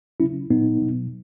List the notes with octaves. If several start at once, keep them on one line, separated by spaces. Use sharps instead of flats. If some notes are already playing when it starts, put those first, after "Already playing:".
C#3 F#3 C#4 E4
A#2 F#3 B3 D#4
B2 F#3